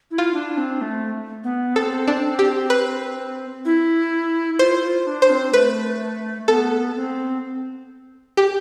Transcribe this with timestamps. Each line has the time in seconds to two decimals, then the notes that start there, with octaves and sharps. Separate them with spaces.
0.11 E4
0.18 F4
0.34 D4
0.57 C4
0.81 A3
1.44 B3
1.75 C4 A4
2.07 D4
2.39 G4
2.70 B4
3.65 E4
4.59 F4 C5
4.83 F4
5.07 D4
5.22 C5
5.30 C4
5.53 A3 B4
6.48 B3 C4 A4
6.95 C4
8.37 G4